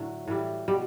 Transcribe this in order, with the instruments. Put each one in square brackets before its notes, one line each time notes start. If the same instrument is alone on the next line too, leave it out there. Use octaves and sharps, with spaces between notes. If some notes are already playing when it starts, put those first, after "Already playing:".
Already playing: [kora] A2 D3 F#3 A3
A2 E3 G3
B2 G3